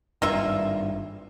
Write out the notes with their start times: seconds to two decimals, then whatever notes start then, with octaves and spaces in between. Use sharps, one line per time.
0.22 G#1 G2 A#3 F4 E5